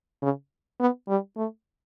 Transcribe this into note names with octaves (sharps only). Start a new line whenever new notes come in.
C#3
B3
G3
A3